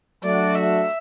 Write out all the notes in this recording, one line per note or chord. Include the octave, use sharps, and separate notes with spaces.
F#3 A3 D4 F#4 D5
E5